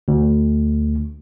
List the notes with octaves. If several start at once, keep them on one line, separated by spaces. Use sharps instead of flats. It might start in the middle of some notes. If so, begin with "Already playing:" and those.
D2